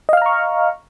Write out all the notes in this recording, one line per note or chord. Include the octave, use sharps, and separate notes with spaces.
D#5 F5 A#5 C#6 F6